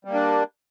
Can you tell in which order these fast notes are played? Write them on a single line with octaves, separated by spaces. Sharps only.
G3 A#3 D4